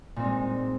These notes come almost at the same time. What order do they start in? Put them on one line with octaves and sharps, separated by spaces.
A#2 C4 D#4 G#3